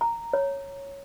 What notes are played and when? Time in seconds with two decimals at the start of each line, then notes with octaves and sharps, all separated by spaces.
0.01 A#5
0.33 C#5